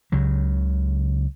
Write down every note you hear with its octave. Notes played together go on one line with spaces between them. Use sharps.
C#2 C#3 F#3